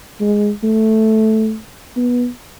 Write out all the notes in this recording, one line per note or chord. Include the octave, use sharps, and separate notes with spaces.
G#3
A3
B3